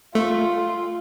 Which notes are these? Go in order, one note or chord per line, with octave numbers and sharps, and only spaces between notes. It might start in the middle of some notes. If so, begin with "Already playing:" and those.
A3 F4